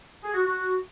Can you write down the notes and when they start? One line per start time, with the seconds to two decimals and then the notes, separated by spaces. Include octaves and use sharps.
0.23 G#4
0.34 F#4
0.45 F#4